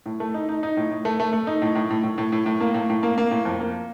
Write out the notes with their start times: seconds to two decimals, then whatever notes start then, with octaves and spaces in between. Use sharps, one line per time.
0.06 A2
0.20 A3
0.34 D#4
0.49 D#4
0.63 D#4
0.77 A2
0.91 A2
1.05 A3
1.20 A3
1.33 A3
1.47 D#4
1.62 A2
1.75 A2
1.90 A2
2.04 A2
2.18 A2
2.32 A2
2.46 A2
2.61 A#3
2.74 A2
2.90 A2
3.03 A#3
3.18 A#3
3.31 A2
3.45 F2
3.60 A#3